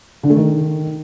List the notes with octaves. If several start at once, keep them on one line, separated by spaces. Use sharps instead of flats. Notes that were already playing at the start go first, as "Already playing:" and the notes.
D3
A3
D#3